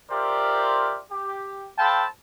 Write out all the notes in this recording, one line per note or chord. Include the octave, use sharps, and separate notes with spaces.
F4 G4 A#4 C5 D5 E5
G4
A4 C5 F5 G5 A5 B5